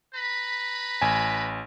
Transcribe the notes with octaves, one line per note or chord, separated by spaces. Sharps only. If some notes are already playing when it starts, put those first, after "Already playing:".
B4 A#5 B5
A1 G#5